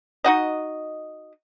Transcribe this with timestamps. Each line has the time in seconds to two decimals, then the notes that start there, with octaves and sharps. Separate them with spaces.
0.24 D#4 F#4 D#5